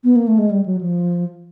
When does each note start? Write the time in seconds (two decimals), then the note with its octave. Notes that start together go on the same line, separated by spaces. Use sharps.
0.04 B3
0.16 A#3
0.27 A3
0.38 G#3
0.51 G3
0.66 F#3
0.81 F3